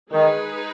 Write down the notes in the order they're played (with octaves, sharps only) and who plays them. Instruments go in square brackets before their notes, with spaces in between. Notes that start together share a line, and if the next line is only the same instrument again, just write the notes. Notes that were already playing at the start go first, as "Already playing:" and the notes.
[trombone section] D#3 [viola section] G#3 D#4 G#4 B4